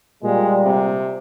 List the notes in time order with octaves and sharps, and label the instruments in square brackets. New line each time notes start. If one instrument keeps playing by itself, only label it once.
[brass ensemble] A#2 G3 [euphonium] G#3
[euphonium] C3